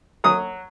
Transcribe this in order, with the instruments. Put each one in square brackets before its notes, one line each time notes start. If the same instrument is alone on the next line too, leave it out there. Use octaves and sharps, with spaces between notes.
[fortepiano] F#3 D#6